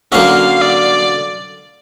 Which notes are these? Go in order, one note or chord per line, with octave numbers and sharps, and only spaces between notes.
D3 F#3 A#3 C#4 F#4 F5
D5